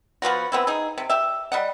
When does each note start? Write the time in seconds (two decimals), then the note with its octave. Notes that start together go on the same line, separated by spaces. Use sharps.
0.22 F3 B3 F4 F#4
0.52 B3 C4 E4
0.67 D#4 G#4
0.98 C3
1.09 G4 E5
1.52 G3 D#5 F#5